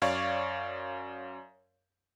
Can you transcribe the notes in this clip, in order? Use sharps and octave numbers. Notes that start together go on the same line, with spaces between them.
F#2 C#5 D5 F5 C#6 G#6